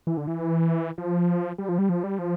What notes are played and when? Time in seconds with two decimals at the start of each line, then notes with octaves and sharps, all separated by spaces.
0.07 E3
0.17 D3
0.27 E3
0.98 F3
1.58 G3
1.69 F3
1.78 G3
1.89 F3
2.04 G3
2.19 F3